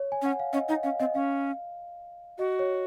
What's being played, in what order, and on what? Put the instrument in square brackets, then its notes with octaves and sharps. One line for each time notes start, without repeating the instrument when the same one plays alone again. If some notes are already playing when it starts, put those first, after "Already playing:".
Already playing: [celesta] C#5
G#5
[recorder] C#4 [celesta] F#5
[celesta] F5
[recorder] C#4 [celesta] D#5
[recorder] D#4 [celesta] D#5
[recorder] C#4 [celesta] F5
[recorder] C4 [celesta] D#5
[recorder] C#4 [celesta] F5
[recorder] F#4 [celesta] D#5
[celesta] C#5